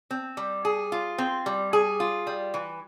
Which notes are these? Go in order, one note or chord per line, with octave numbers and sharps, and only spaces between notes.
C4
G3
G#4
F4
C4
G3
G#4
F4
G3
E3